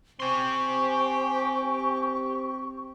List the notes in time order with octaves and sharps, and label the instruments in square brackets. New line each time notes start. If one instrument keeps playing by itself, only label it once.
[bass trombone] C4 [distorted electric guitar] G4 C6 [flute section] C5 G5 G#5 [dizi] C#6